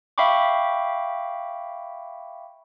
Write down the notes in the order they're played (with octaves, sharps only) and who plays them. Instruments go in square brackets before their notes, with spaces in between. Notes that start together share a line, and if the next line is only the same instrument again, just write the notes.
[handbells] E5 F5 G5 B5 C#6 D6